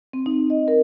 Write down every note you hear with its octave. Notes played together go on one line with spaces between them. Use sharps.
C4
D#4
D#5
A#4